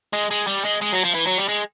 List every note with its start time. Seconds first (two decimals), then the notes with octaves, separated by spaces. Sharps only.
0.13 G#3
0.31 G#3
0.47 G3
0.64 G#3
0.81 G#3
0.92 F#3
1.04 F3
1.14 E3
1.26 F#3
1.38 G3
1.48 G#3